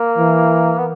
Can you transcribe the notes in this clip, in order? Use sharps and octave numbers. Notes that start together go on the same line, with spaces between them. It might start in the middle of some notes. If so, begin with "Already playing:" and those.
Already playing: A#3
E3
B3